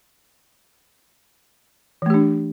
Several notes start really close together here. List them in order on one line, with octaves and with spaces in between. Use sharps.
E3 A3 G4 D4